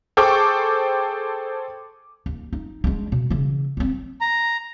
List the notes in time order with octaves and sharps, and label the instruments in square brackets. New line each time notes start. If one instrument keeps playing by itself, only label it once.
[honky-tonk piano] G#4 A4 C5 G5 C#6 D6
[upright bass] D#2
D#4
G#3 D4
B2
C#3 E3
G#3 C4
[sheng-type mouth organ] A#5